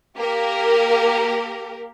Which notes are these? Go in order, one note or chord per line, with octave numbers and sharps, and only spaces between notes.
A#3 G4 A#4